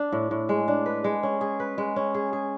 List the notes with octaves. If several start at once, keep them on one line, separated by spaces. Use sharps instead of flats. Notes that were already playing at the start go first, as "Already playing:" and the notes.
Already playing: D4
A2
A2
G#3
D4
B4
G#3
C#4
G#4
B4
G#3
C#4
G#4
G#4